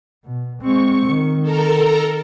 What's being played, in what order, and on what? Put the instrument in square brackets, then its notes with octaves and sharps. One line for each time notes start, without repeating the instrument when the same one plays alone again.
[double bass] B2
[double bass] G#3 C4 [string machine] C#6
[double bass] D#3
[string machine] A4 A#4 A#5